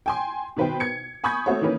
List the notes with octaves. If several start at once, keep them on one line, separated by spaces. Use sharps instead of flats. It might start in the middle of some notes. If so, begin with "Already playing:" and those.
G5 G#5 C6
B2 D#3 B4 C5 G5
G#6 C#7
G#5 B5 C#6 D#6 G6 G#6
A3 C4 F#4 A4 C#5
D#3 E3 A#3 C#4 B4